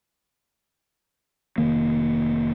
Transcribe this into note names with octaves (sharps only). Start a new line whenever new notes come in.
F1 D#3 A#3